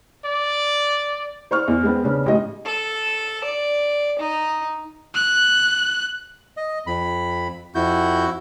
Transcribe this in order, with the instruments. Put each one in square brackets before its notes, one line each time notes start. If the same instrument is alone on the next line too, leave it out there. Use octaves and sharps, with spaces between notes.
[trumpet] D5
[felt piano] C5 D5 C#6 F6
E2
G#3 B3 C4
C#3 B3 C#4 D4
A1 G#2 D#5
[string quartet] A4
D5
D#4
[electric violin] F#6
[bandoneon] D#5
F2 B5
[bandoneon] F2 G6 [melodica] E4 F#4